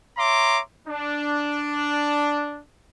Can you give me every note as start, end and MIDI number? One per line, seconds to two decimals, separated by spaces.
0.18 0.60 73
0.18 0.60 76
0.18 0.60 82
0.18 0.60 84
0.18 0.60 86
0.88 2.60 62